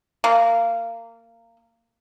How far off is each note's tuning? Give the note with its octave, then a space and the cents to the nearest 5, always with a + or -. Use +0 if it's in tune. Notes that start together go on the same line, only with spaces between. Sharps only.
A#3 -20